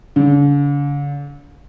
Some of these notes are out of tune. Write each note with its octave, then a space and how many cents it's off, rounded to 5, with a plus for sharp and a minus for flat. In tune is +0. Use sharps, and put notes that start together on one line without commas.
D3 -45